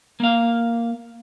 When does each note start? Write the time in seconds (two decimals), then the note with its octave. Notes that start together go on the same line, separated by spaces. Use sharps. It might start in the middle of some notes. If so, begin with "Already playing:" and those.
0.20 A#3 F5